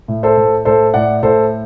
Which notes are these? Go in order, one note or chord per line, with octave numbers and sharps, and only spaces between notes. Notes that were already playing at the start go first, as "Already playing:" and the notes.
A2
A4 C5
A2
A2 A4 C5
A2 D5 F#5
A2 A4 C5